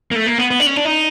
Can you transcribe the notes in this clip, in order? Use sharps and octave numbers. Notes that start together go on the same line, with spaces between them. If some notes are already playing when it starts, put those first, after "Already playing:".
A#3
A3
A#3
B3
B3
D4
C#4
D4
D#4